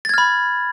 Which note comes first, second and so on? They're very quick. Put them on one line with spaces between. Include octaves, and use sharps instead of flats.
A6 G#6 F6 B5